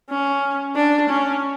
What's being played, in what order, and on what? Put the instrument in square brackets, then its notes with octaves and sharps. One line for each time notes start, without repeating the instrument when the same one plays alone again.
[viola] C#4
D4
C#4